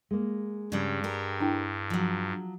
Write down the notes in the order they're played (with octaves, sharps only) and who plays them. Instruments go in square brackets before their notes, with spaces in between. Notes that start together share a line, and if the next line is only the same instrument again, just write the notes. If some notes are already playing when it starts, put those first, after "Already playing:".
[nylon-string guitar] G#3 A#3
[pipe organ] G2 [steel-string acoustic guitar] C#3 G3
[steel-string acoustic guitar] G4 A#4
[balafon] D4 E4 G5
[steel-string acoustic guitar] F3 F#3